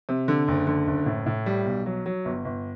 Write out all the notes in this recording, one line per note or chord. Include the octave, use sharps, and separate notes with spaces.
C3
D3
F#1
D3
F#1
A2
A2
G3
B1
F#3
F#3
G1
G1